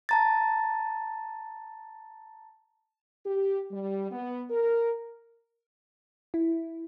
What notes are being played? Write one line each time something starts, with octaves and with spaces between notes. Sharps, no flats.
A5 A#5 A6
G4
G3
B3
A#4
E4